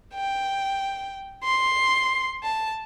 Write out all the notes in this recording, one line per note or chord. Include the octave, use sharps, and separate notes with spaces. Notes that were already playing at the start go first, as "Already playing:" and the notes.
G5
C6
A5